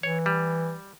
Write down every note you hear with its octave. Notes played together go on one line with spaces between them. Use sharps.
E3 C#5
G3